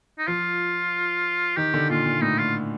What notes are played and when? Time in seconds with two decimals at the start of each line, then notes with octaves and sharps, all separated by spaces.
0.18 D#4
0.27 F3 F4
1.57 D#3 G4
1.74 D3
1.90 A#2 F4
2.06 A#2
2.22 A2 D#4
2.38 F4